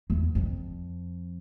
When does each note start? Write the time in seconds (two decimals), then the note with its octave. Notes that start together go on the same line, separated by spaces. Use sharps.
0.10 E2
0.35 F2